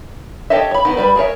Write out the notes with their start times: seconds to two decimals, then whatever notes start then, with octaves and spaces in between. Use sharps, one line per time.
0.50 G4 A4 C#5 D#5 E5
0.71 C#5 B5
0.85 D#3 B3
0.97 G3 B4 B5
1.16 G#4 A#4 C#5 E5